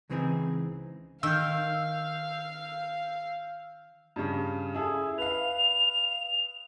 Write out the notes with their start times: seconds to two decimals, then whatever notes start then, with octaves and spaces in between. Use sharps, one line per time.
0.10 C#2 C#3 E3 C4 D#4 G#4
1.23 D#3 F5 E6 F6 G6
4.16 G2 C#3
4.74 E4 G#4 A4
5.18 B4 F5 F7